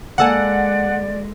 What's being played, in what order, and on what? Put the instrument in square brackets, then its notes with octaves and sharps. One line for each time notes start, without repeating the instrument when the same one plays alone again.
[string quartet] G#3 [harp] A#3 A4 G#5 [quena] D5 [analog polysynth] F#5